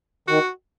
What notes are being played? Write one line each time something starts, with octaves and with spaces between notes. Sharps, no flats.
D#3 F#4